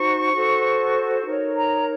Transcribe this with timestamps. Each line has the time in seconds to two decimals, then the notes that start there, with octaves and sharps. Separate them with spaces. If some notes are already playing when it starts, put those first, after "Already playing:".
Already playing: D#4 F#4 C5 C#6
0.34 F#4 A4 C5
1.26 D#4 A#4 C#5
1.57 A#5